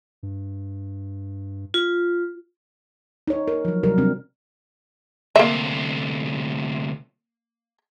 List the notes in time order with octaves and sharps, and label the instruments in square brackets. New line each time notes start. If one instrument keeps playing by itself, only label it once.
[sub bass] G2
[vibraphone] F4
[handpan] D#4 C#5
A#4
F3 F#3
C3 F#3 G3 A#4
C3 G3 C4 D4
[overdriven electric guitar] D2 C3 [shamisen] A#3 E5